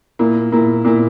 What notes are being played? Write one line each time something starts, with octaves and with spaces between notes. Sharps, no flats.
A#2 A#3 E4
A#2 A#3 E4
A#2 A#3 E4